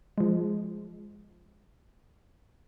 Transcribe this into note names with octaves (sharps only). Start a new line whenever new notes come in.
F3 G#3